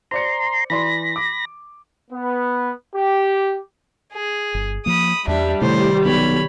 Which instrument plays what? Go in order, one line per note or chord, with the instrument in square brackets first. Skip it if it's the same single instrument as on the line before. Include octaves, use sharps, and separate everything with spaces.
[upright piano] C5 D5 C#7 [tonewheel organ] A#5 C6
[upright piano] E3 D5 C6 [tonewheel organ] B5 A#6
[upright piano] D6
[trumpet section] B3
G4
[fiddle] G#4
[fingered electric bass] G1
[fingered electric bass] F3 A#3 [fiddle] B5 D#6
[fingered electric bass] E2 [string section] G3 [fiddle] D4 E5
[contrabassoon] A2 [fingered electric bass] C3 D#3 [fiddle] C5
[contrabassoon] B1 [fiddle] C#5 B5